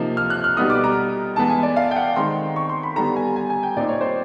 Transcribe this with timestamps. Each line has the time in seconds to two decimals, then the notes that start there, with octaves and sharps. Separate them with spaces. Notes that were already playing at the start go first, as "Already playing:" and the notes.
Already playing: C3 F3 A#3 D#4
0.17 F6
0.30 F#6
0.44 F6
0.57 B2 G3 B3 D#4 D#6
0.70 D6
0.84 A#5
1.36 E3 G#3 B3 A5
1.50 G#5
1.63 D5
1.76 F5
1.91 G5
1.96 F#5
2.16 D#3 G#3 C4 C6
2.56 C#6
2.69 C6
2.83 B5
2.96 D3 G3 B3 A#5
3.16 G#5
3.36 G#5
3.50 G#5
3.63 G5
3.76 A#2 G3 C4 D#4 D5
3.89 C#5
4.01 C5